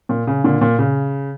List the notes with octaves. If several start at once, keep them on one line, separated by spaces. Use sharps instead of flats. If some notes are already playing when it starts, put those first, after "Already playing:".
A#2
C#3
A#2 D3
A#2
C#3